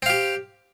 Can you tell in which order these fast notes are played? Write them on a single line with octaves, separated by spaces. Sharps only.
C4 F5 G4